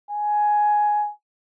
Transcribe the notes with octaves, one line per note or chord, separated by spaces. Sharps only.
G#5